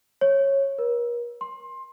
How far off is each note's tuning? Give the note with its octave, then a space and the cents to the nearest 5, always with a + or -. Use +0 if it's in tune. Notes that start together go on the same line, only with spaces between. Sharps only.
C#5 -15
A#4 +40
C6 +20